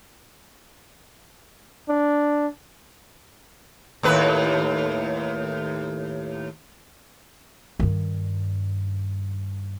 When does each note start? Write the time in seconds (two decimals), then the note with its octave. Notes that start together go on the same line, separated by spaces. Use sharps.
1.89 D4
4.03 D#2 A2 B4
7.80 G2 D#3